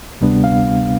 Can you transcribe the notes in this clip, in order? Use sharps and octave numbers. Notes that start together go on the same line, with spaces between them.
D2 C3 G3 B3 D4
F5